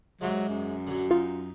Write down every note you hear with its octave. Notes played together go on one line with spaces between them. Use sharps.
G#2 C3 F#3 G#3
F#2
D3 F#3
D#4 F4